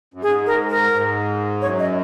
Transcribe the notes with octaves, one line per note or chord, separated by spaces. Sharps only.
F#2
G#2 G#4
A#4
A#4
G#2
F#2 C#5
D#5